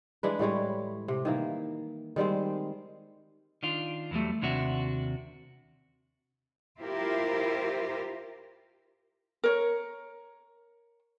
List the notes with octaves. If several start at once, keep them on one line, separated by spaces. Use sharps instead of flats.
E3 G#3 D4 B4
A2 G3 G#3 C#5
C3
D#3 E3 A#3
D#3 G3 G#3 C4
D#3 D4 F4
E2 F#3 G3 A3
D#2 C3 D4 F#4 E5
E4 F4 G4 A#4 C5
A#4 C#5